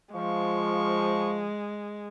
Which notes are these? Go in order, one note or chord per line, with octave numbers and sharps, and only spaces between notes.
F3 G#3 C#6